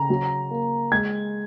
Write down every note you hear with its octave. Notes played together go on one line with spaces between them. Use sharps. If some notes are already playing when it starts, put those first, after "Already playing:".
Already playing: C#3 A#5
F#3
A#3
G#3 G#6